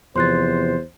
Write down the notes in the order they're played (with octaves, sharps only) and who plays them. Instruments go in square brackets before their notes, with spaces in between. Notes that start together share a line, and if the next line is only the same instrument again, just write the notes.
[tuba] E2 [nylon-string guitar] C3 F3 [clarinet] C5 [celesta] C6 F#6 A6